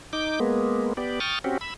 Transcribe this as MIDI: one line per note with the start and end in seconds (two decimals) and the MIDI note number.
0.13 0.40 63
0.13 0.40 86
0.13 0.40 91
0.40 0.93 56
0.40 0.93 58
0.40 0.93 59
0.97 1.20 59
0.97 1.20 67
0.97 1.20 74
1.20 1.39 79
1.20 1.39 85
1.20 1.39 87
1.20 1.39 89
1.20 1.39 93
1.44 1.58 60
1.44 1.58 61
1.44 1.58 66
1.44 1.58 67
1.61 1.74 83
1.61 1.74 88